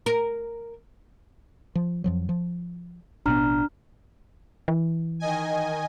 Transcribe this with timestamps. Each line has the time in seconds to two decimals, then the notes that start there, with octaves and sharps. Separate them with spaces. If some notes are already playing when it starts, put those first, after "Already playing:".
0.06 A#4
1.75 F3
2.04 F2 F3 F#3
2.29 F3
3.26 A1 B2 B3 D4 A#5 F6
4.68 E3
5.20 D#3 D#5 G#5